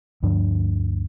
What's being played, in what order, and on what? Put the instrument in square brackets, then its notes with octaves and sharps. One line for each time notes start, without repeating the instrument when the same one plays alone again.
[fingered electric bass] D2 G2 F3 D4